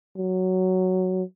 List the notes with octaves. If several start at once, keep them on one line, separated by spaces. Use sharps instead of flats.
F#3